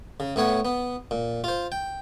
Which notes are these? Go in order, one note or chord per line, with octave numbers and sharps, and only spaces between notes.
C#3
A2 B3 C#5 F#5
B3
A#2
F4 C5
G5